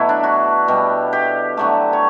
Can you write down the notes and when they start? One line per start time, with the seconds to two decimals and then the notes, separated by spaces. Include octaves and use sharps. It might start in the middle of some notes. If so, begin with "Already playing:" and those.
Already playing: B2 F#3 A3 E4
0.09 D4
0.23 F#4
0.68 B2 G3
1.13 G4
1.57 D3 F#3 A3
1.93 C#5